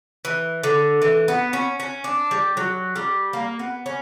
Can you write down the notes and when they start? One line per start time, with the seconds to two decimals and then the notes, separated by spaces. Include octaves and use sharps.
0.25 E3
0.63 D3
1.02 E3
1.28 B3
1.53 C#4
1.80 C#4
2.04 D4
2.31 G3
2.57 F#3
2.96 G3
3.33 A#3
3.59 B3
3.86 C#4